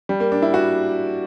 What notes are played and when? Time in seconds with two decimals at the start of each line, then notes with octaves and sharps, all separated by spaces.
0.09 G3
0.20 A#3
0.32 D4
0.42 E4
0.54 F#4